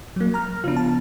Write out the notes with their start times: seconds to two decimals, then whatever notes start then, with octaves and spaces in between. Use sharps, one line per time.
0.16 F#3 A#3
0.34 A#5 F6
0.64 C#3 F3 B3 D4 F4
0.76 A5